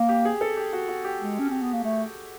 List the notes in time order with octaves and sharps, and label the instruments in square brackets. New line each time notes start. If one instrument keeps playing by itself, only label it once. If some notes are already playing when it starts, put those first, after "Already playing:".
Already playing: [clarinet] A#3
[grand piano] G4
G#4
A4
G4
F#4
F#4
G4
[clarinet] G#3
C#4
C4
B3
A#3
A3